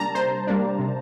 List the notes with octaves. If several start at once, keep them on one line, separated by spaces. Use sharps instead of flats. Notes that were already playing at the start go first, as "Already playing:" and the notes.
Already playing: C3 G3 A#3 D4 A5 A#5
C3 C5
G3 A#3 D4
C3